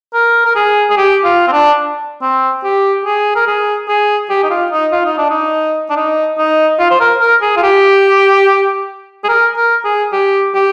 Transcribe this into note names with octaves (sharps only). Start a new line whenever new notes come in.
A#4
A#4
G#4
G#4
G4
F4
C4
D4
C4
G4
G#4
A#4
G#4
G#4
G4
D#4
F4
D#4
F4
D#4
D4
D#4
D4
D#4
D#4
F4
C5
A#4
A#4
G#4
F4
G4
G#4
A#4
A#4
G#4
G4
G4